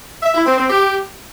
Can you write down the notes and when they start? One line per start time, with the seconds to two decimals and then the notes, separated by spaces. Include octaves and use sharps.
0.23 E5
0.35 E4
0.47 C4
0.58 C4
0.70 G4